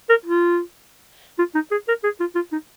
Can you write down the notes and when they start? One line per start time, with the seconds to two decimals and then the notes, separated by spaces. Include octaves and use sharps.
0.09 A#4
0.26 F4
1.38 F4
1.55 D#4
1.71 G#4
1.88 A#4
2.04 G#4
2.20 F4
2.35 F4
2.52 D#4